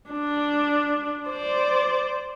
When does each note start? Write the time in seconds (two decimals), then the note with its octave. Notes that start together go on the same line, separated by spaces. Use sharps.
0.11 D4
1.29 C5 D5